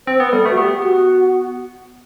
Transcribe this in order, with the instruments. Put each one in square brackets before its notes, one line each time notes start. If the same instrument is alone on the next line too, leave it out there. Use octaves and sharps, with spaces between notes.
[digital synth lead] C4 [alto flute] C5
[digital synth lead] B3 [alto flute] B4
[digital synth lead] G3 [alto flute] A4
[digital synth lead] A3 [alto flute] B4
[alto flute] F#4
[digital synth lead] B3 [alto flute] G4
[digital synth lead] B3 [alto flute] F#4